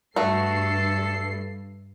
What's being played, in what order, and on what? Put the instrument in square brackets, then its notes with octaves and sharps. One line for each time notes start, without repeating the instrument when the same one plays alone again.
[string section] G2 C7 [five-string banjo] A3 F#4 [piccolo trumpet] A4